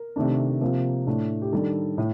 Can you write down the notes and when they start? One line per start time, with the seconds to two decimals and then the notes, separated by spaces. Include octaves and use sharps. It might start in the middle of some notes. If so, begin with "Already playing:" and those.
Already playing: A#4
0.16 C3 D#3 A3 D4
0.61 C3 F3 A#3
1.07 A2 A3 D4
1.42 G4
1.52 D#3 G3 D4 A4
1.98 A2